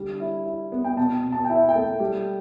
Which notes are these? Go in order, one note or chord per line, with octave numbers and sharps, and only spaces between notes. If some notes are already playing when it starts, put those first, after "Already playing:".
Already playing: D3 G3
E4
E4
B3
G5
B2 A5
B2
A5
G5
E4
E5
G5
A3
G3